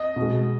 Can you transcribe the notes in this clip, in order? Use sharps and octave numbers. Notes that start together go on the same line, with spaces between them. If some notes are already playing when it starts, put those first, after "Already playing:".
Already playing: D#5
B2
G#3